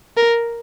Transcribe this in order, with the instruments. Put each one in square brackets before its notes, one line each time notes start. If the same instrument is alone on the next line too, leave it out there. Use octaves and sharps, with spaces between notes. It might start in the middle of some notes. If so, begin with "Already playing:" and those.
[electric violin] A#4